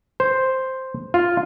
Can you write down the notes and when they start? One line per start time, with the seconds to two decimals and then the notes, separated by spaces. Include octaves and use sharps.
0.20 C5
1.14 F4